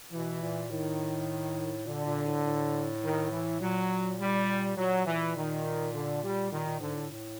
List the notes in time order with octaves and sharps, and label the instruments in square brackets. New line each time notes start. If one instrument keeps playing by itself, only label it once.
[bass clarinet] B2 [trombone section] E3
[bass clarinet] A#2
[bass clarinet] A2 [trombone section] D#3
[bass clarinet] A#2 [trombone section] D3
[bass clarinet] A#2
A2
A2
[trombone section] D#3
E3
[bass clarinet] A#2 [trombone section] F#3
[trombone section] G3
[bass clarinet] A#2 [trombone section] F#3
[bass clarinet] A#2 [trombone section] E3
[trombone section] D#3
D3
G3
[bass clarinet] A#2 [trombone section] D#3
[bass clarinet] A#2
[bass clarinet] G#2 [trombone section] D3
[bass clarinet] A2
A2